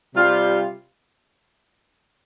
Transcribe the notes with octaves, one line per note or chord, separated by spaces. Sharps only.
C3 G3 F4